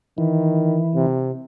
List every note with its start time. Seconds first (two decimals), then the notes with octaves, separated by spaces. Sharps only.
0.18 D#3 E3
0.95 C3